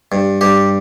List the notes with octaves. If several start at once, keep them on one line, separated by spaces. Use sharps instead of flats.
G2
G2 G4